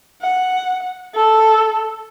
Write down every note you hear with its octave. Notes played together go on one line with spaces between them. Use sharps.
F#5
A4